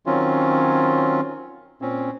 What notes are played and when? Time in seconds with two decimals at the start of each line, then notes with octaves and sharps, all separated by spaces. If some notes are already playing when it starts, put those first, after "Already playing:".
0.06 D#3 F#3 C4 C#4 F4
1.82 A#2 C4 C#4